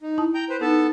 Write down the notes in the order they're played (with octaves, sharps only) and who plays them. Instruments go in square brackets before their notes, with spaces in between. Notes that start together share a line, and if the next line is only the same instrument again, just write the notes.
[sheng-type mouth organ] D#4
[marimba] E4 A5 D#6
[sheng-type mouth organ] G5 A#5 G6
B4 C5
[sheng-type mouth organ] B3 A4 A5 [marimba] D#4